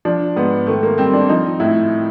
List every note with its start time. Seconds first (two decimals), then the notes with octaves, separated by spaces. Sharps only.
0.05 F3 D4
0.36 G#2 B3
0.67 D#3 A3
0.83 A#3
0.98 G3 C4
1.13 D4
1.29 F3 D#4
1.60 A2 E4